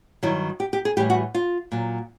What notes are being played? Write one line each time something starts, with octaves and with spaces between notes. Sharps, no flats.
G2 D#3 F#3 E4
G4
G4
G#4
A2 E3 G3 G4
F#4
F4
A#2 F#3